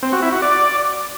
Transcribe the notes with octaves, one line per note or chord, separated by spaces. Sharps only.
C4
F#4
E4
F#4
D5